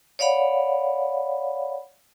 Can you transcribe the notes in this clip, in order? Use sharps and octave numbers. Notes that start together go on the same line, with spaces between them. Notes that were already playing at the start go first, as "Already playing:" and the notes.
C#5 D5 F5 F#5 B5